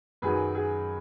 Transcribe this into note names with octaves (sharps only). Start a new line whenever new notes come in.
F#2 D#3 F#3 G#4 B4
G#4